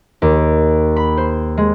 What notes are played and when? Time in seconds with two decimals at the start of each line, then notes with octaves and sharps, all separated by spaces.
0.22 D#2
0.96 B5
1.17 C5
1.57 G#3